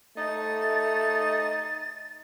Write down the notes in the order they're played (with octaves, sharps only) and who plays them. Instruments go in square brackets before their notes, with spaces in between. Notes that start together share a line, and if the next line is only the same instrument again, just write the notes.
[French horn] A3 [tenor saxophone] D#4 [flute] A6